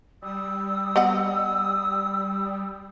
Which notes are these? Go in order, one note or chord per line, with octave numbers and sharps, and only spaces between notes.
G3 D#6 E6
B3 D#5 F#5